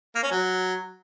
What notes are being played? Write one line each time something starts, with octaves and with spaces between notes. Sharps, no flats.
A#3
C#4
F#3